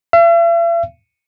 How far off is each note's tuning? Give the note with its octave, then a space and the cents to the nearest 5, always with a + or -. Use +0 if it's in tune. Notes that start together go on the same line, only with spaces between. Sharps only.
E5 +45